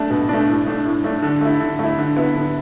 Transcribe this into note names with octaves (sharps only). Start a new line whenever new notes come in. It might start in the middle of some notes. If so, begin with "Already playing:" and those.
Already playing: A3 D4
B2
A3 D4
A2
A3 D4
A2
A3 D4
D3
A3 E4
D3
A3 E4
D3
B3 E4
D3